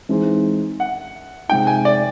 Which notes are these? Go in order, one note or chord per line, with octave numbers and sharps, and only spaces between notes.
E3 G#3 C4 D#4
F#5
C3 F3 G#3 C4 D#4 G5
G#5
D5